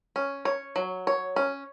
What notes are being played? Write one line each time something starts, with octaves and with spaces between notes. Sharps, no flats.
C#4
C#5
F#3
C#5
C#4